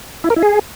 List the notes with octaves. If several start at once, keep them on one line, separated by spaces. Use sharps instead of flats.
E4
A#4
E4
G#4